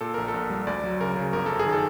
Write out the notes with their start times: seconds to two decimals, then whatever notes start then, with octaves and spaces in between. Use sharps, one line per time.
0.01 A#2 A4
0.14 A#1 A#4
0.28 A4
0.34 A#1
0.50 G3
0.67 D2 D5
0.84 F#3
1.00 C#3 A#4
1.17 C#3
1.33 G1 A#4
1.46 F#2 A4
1.59 G#4
1.66 D#3
1.73 A4